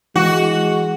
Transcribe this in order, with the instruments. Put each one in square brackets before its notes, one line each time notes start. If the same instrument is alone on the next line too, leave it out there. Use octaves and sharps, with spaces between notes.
[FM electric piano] E3 [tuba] G#3 [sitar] F#4